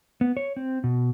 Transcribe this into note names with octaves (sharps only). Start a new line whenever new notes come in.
B3
C#5
C4
B2